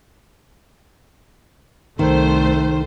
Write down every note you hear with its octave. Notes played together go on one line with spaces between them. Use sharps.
C2 D#3 A3 C5